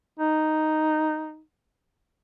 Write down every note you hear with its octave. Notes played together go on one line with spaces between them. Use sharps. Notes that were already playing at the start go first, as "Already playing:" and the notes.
D#4